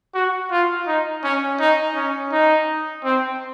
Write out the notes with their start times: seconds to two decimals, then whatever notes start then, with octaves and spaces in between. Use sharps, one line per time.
0.14 F#4
0.51 F4
0.87 D#4
1.23 C#4
1.59 D#4
1.96 C#4
2.32 D#4
3.04 C4